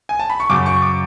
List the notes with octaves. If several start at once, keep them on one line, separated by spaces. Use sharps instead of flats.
G#5
A5
B5
C#6
F#2 C#3 F#3 D6
C#6
D6